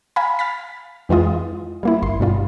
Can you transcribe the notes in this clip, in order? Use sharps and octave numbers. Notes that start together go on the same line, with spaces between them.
F5 G#5 A#5 B5
F6 A6 B6
F2 E3 G#3 F4 D#5
G3 A#3 E4
G1 C6
G2 B2 G3 F4